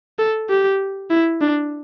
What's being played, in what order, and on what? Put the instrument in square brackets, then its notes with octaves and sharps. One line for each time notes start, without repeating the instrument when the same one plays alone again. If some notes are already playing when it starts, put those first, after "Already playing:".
[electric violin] A4
G4
E4
D4